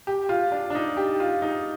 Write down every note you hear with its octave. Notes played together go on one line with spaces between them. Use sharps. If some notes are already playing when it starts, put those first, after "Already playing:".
G4
F4
D4
D4
D#4
G4
F4
D#4